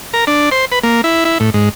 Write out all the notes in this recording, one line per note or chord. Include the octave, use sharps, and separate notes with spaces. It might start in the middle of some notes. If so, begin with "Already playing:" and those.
A#4
D4
C5
B4
A#3
E4
E4
A2
G#2